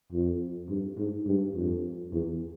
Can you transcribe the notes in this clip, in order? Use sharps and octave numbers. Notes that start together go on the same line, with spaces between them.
F2
G2
G#2
G2
F2
E2